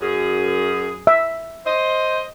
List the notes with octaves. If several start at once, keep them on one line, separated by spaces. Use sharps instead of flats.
F#2 G#4
E5
C5 D#5